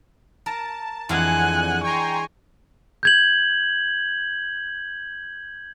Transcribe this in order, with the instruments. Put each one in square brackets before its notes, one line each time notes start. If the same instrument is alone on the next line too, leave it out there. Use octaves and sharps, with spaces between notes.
[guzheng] A#4 [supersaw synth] A5
[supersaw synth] F2 F#5 [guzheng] E3 G#3 D4 [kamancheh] G#5 F#6
[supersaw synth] G5 A#5 C6 [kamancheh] G#5 C#6
[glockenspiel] G6 G#6 F#7